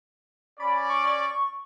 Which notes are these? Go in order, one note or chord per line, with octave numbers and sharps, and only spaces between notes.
C#4 D5 B5
C#6